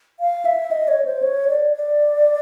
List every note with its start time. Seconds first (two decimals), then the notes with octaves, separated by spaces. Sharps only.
0.20 F5
0.45 E5
0.71 D#5
0.88 C#5
1.05 C5
1.22 C#5
1.48 D5
1.73 D5